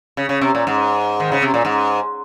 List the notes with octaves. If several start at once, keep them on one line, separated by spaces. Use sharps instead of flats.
C#3
C#3
C3
A#2
G#2
D#3
C#3
C3
A#2
G#2